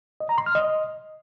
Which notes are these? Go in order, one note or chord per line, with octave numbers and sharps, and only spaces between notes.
D#5
A#5
C6
F6
D#5